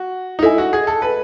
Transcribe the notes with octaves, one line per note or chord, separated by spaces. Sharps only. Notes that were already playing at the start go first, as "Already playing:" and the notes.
Already playing: F#4
D#4
E4 A4 D#5 G#5
F#4
G#4
A4
B4